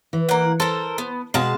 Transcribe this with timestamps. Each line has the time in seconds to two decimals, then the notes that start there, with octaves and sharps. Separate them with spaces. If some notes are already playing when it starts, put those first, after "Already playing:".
0.13 E3
0.29 A#3 F#5
0.60 A4 A#4 C5
0.98 B3
1.34 B2 G#3 F5 A5